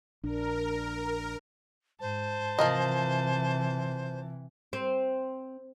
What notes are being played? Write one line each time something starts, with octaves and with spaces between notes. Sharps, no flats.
A#1 D4 A#4
G#2 C5 A5
C3 E3 F3 A#4 D#5
C4